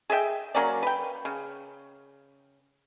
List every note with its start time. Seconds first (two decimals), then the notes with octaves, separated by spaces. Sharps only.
0.10 G#4 D#5 E5 G5
0.55 F#3 A#3 C#4 D5
0.83 B4 G5
1.25 C#3